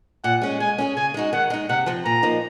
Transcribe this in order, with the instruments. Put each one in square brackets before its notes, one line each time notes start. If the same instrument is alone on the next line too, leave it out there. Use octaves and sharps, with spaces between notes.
[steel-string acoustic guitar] A#2 [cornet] F#5
[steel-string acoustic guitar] G#3 C#4 G#4
[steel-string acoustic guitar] G#3 [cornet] G#5
[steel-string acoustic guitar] C#4 F4 G#4
[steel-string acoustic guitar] C#3 [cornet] G#5
[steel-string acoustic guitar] G#3 D#4 F#4
[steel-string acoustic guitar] D#3 [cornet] F#5
[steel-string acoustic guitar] G#3 D#4
[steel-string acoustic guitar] C3 [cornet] F#5
[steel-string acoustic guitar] F3 C4
[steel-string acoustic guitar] A#2 [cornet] A#5
[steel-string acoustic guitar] F3 A#3 D#4